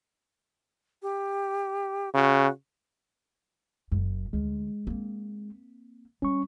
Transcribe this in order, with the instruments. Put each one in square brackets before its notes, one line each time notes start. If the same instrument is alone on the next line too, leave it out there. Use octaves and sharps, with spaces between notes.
[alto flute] G4
[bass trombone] C#3 [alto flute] F#4
[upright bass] F#1 F#2
[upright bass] D2 D3 [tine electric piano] G#3
[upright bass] A#3 C4
[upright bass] G3 [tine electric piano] C#4 C#6